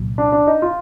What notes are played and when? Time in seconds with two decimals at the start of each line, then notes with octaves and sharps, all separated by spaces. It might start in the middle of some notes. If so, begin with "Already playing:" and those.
Already playing: C2 A#2 F#3
0.18 D4
0.32 D4
0.47 D#4
0.62 F4